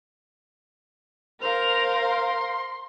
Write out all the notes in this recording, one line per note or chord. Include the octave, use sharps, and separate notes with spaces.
A#4 C5 F5 F7
C6